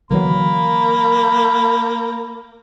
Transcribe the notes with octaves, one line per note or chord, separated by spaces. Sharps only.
D3 E3 F#3 A#3 B5